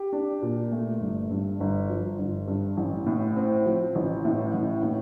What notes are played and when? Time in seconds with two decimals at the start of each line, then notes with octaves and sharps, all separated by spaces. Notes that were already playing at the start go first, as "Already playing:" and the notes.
Already playing: G4
0.13 D4
0.42 A#2
0.72 A3
1.00 G1
1.30 G2
1.60 G1
1.89 F3
2.18 G1
2.47 G2
2.77 A1
3.07 A2
3.36 C4
3.66 F3
3.95 A1
4.25 A2
4.53 A1
4.83 A2